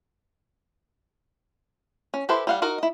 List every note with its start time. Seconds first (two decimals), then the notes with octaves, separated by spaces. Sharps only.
2.14 C#4
2.29 E4 G4 A4 B4 C5
2.47 G3 F5 F#5
2.62 D#4 F#4 A#4 D#5
2.78 E4 D#5